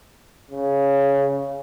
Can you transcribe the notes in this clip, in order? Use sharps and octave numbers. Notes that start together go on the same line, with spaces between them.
C#3